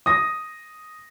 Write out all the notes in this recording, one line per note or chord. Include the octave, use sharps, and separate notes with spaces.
D#6 A#6